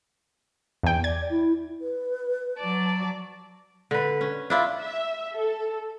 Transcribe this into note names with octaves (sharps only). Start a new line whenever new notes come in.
E2 G5
D5 G#6
E4
B4
F#3 D5 A5
D3 B4
C#4
D4 E4 F4
E5
A4